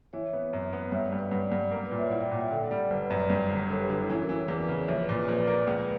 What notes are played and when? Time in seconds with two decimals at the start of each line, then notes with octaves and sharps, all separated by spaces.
0.13 E3 C#5 E5
0.33 B3
0.53 F#2
0.73 B3
0.92 G2 C#5 E5
1.05 D5 F#5
1.13 G2
1.19 B4 D5
1.31 G2 D5 F#5
1.52 G2
1.71 A#3
1.85 B4 D5
1.91 A#2
1.98 C#5 E5
2.10 E4 D5 F#5
2.20 E5 G5
2.31 A#2
2.40 E5 G5
2.50 D3 D5 F#5
2.63 D5 F#5
2.71 G3
2.76 D5 F#5
2.90 G1 B4 D5
3.10 F#2
3.30 G2
3.50 G1
3.69 D3 A#4 C#5
3.79 G4 B4
3.89 D3 D4 F#4
3.99 E4
4.10 E3 C#4
4.22 F#4 A#4
4.29 E3
4.35 A#4 C#5
4.48 E2 B4 D5
4.68 C#3
4.88 A#1 C#5 E5
5.01 B4 D5
5.09 A#2
5.14 B4 D5
5.28 A#1 B4 D5
5.47 A#3
5.67 C#2